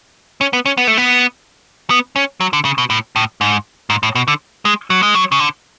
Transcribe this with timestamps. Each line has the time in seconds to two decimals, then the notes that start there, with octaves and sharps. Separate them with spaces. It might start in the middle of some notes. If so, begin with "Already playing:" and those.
0.41 C#4
0.53 B3
0.66 C#4
0.77 B3
0.88 A3
0.97 B3
1.90 B3
2.16 C#4
2.41 F#3
2.53 D3
2.65 C#3
2.78 B2
2.90 A2
3.16 A2
3.41 G#2
3.90 G#2
4.03 A2
4.15 B2
4.28 D3
4.65 G#3
4.90 F#3
5.03 G#3
5.15 F#3
5.32 C#3
5.40 D3